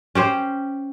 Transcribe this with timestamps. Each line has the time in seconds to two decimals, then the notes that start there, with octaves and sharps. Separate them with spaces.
0.15 C#4 G4 C5